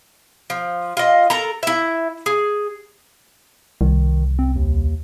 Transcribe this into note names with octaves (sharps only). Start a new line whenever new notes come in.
F3
F4 D#5
A4 A#4 A#5
E4 E5
G#4
C2 D#3
C4
D#2